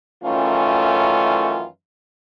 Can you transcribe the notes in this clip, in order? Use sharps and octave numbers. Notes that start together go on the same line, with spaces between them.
F#2 D#3 E3 A3 C#4 F4